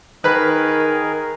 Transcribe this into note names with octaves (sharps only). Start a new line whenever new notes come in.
D#3 G#4 A#4 B4 B5